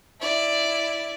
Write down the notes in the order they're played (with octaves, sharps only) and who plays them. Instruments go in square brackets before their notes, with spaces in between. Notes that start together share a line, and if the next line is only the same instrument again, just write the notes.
[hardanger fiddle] E4 D5